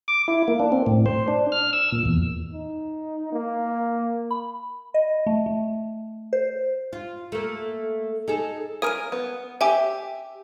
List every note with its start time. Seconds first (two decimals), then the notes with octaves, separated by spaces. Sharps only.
0.08 D6
0.28 E4
0.48 A#3
0.60 D4
0.72 C4
0.86 A2
1.06 C5
1.28 D4
1.52 F6
1.73 E6
1.92 A#2
2.05 E2
2.53 D#4
3.32 A#3
4.31 B5
4.94 D#5
5.27 A3
5.46 A3
6.33 C5
6.93 F4
7.32 A3 A#3
8.28 D#4 G#4 A4
8.82 A#4 G#5 D#6 F6 D#7
9.12 B3
9.61 G4 E5 G5 G#5 D6